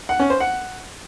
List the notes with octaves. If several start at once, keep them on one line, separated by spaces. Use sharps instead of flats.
F#5
C#4
C5
F#5